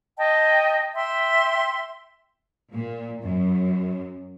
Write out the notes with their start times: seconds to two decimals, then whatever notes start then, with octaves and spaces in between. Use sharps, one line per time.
0.17 D#5 G5 A5
0.95 E5 G5 C6
2.72 A#2
3.21 F#2